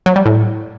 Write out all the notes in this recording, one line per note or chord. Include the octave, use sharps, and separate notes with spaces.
F#3
G3
A2